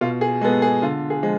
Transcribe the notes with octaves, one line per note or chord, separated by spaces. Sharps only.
B2 F4
G#4
G#3 B3 A4
G#4
D3 F4
G#4
F3 G#3